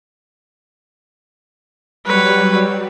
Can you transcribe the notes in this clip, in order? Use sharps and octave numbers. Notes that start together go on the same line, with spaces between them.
F#3 G3 B4 C#5